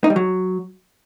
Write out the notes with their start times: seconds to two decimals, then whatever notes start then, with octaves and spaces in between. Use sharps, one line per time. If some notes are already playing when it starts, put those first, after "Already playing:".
0.04 D#4
0.10 G3
0.16 F#3